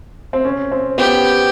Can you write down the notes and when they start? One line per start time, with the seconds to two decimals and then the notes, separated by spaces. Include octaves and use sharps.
0.33 C4
0.45 C#4
0.71 C4
0.98 B3 G4